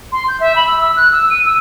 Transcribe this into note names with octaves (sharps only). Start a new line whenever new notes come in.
C6
G6
E5
B5
E6
E6
F#6
E6
D#7
E6